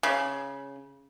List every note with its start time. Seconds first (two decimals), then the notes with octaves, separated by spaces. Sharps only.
0.03 C#3